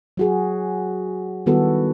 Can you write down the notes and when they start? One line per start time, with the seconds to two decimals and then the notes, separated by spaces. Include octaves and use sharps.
0.17 F#3 F#4 G#4
1.46 D#3 G3 B3 E4 F#4 A4